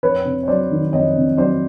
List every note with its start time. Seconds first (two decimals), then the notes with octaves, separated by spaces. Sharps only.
0.03 F2 B4 C#5
0.25 C3
0.43 C#5
0.48 F#3 C5 D5
0.71 D#3
0.93 F2 C#5 D#5
1.16 C3
1.37 F#3 C5 D5